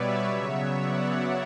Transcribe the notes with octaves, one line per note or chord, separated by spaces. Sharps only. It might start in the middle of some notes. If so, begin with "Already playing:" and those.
Already playing: B2 G3 B3 B4 C#5 D5 E5
C#3 F#3 B3
D5 F#5